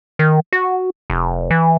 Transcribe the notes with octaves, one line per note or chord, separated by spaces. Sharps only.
D#3
F#4
F1
E3